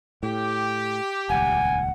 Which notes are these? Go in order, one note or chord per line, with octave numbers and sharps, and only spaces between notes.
A2 G4
D#1 C#2 F#5 G#5